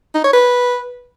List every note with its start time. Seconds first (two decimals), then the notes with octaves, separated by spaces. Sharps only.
0.15 D#4
0.24 C#5
0.33 B4